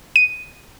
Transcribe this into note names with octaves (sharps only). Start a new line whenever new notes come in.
D#7